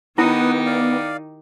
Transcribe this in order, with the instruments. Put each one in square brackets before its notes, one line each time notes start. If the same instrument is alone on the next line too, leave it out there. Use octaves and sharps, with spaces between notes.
[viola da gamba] D#3 D#4 G4 [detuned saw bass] B3 [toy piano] E4 [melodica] B4 F#5 D#6
[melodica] D5 F5